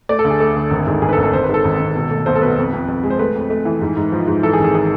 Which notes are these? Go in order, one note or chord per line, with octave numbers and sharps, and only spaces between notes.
A3 D5
A4
D2
G#4
A3
D2
G#1
G#2
G#2 G#4
B4
A4
G#1
A4
G#1 C5
G#2 B4
A4
G#1
G#1
B2
A3
B1 C5
A4
B2 B4
F2
F2
F2
G#3
C5
A3 B4
F2
A3
E3
G#2
G#2
F3
G#2
E3 A4
G#4
G#1
G#4
G#4